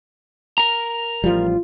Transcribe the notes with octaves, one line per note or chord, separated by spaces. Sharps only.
A#4 A#5
A1 F3 G3 F4